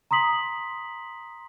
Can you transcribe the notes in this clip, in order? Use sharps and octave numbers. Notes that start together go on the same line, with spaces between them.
A#5 C6 D#6 B6 F#7